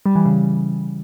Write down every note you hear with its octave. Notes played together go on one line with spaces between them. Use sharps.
G3
E3
C#3